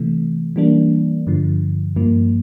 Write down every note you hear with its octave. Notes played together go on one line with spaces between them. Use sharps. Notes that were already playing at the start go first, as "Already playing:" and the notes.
Already playing: C3 E3 A3
E3 G3 A#3 D4
G2 D3 F3
G2 F3 A#3